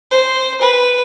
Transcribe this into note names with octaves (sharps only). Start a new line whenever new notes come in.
C5
B4